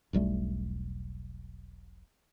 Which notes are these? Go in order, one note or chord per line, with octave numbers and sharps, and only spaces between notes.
E1 B1 G3 A3